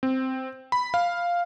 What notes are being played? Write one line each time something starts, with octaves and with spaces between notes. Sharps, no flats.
C4
B5
F5